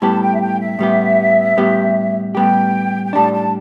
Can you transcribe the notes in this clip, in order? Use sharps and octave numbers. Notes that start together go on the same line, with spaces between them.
A2 G3 B3 G4 A5
G5
E5
G5
E5
A2 G3 B3 G4
A2 G3 B3 G4
A2 G3 B3 G4 G5
G5
A2 G3 D4 A5
A5